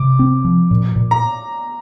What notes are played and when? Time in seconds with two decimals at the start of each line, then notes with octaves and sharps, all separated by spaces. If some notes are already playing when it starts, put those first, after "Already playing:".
Already playing: C3 D6
0.19 C4
0.45 F3
0.71 A#2
0.96 A#2
1.11 A#5